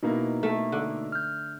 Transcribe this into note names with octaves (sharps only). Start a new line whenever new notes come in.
B2 A#3 D#4 E4
A3
D3
F6 G6